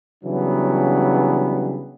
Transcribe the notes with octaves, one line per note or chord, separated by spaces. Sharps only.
C#3 E3 F#3 G3 B3 D4